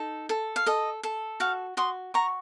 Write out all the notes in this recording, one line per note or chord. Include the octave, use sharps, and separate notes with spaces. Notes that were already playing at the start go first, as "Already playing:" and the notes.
Already playing: D#4 A4
A4
F5
A4 D#5
A4
F#4 F5
F#4 C6 D#6
F#4 A#5 C#6